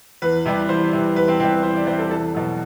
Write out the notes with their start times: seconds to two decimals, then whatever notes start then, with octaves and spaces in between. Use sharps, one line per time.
0.22 E2 B4
0.45 C3 E3 G3
0.69 E2 C5
0.93 C3 E3 G3
1.16 E2 B4
1.28 C4
1.39 C3 E3 G3 C4
1.52 B4
1.63 E2 C5
1.75 D5
1.87 C3 E3 G3 C5
1.99 A4
2.11 E2 A4
2.35 B2 F#3